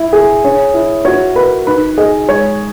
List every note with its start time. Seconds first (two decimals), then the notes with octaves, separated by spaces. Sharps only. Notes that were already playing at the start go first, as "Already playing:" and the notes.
Already playing: E4
0.13 G#4
0.44 C#4
0.74 E4
1.05 F#4 C#5
1.35 A#4 B4
1.66 D#4 B4
1.97 G#4 D#5
2.28 G#3 C#5